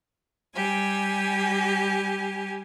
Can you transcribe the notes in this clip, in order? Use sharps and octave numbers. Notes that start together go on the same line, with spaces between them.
G3 G4 G#5